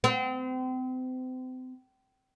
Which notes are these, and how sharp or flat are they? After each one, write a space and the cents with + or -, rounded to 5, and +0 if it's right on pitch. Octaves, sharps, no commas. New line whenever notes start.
C4 -35